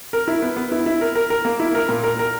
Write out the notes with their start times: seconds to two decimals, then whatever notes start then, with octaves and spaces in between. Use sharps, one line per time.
0.13 A#4
0.28 E4
0.42 B3
0.57 B3
0.72 E4
0.86 E4
1.01 A#4
1.15 A#4
1.30 A#4
1.45 A#3
1.60 E4
1.75 A#4
1.89 A#2
2.04 A#4
2.19 A#4